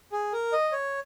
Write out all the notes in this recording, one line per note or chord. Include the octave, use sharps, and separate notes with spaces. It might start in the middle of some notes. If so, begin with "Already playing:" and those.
G#4
A#4
D#5
C#5